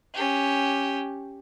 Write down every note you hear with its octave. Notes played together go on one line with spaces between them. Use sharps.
C#4 G4